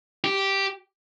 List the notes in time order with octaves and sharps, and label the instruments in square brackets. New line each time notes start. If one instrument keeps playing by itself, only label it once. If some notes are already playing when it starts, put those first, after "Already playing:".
[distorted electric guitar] G4